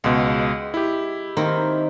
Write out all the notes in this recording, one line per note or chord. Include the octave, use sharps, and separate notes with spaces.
C#2 B2 G#3
E4 G4
D#3 A#3 C4